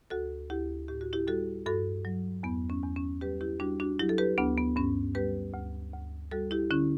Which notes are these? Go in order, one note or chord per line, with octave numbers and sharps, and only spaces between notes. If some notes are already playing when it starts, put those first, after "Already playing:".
D2 F#4 A4
D2 E4 G4
A2 G4
F#4
E4 G4
G3 F#4 A4
G2 F#4 A4
F#3
E2 B3
C#4
E2
C#4
G3 G4 B4
E4 G4
G3 D4 F#4
D4 F#4
F#3 E4 G4
A4
G4 B4
D2 B3 D4
B3
G2 C#4
G3 G4 B4
D2
D2
G3 F#4 A4
E4 G4
D3 C#4 E4